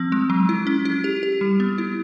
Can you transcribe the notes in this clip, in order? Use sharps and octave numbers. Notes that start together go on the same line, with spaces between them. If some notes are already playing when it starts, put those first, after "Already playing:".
Already playing: F3 C4
G#3
F#3
E4
C#4
E4
G4
G4
G3
B3
E4